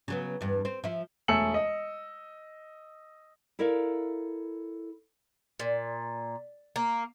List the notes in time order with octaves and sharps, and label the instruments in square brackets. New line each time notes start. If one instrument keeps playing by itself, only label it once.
[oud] C#3 F#3 B3
E2 G2
C4
F3 E4
[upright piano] E1 A3 G#5 E6 C#7 F#7
D#5
[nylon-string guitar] E4 A4 A#4 D5 F5
[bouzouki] A#2
A#3